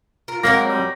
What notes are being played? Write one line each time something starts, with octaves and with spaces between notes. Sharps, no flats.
F4 A#4
F#3 G#3 A#3 C4 F#4 A#4 C#5 A#6
G3